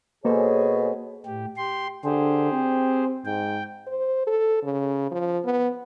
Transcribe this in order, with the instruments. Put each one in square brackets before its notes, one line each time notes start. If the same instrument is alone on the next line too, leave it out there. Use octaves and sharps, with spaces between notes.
[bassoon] B2 [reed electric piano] A#3 A4 C5 [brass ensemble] G#4 C#5
[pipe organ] A2 G4
G4 C6
[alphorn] D3 [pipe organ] G4 G#4 C5
[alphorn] C4
[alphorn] G#2 [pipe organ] G5
[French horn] C5
A4
C#3
F3
B3